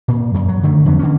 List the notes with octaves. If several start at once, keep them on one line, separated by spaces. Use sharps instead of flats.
A#2
F#2
F#3
D3 D#3 A3
F2 D3 F#3 B3
D3 E3 C#4